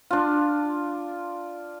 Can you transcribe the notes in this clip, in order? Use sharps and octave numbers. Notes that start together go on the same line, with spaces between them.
D4 F4